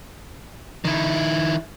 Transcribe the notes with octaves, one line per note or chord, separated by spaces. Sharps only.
D#3 E4